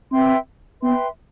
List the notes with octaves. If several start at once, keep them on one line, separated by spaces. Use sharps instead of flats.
C4 B4 E5 G5 C6
B3 B4 E5 G5 C6